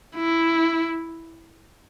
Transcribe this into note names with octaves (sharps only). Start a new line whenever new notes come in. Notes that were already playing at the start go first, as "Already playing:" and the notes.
E4